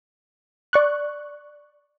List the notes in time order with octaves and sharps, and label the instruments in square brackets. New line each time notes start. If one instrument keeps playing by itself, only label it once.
[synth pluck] D5 C#6 F#6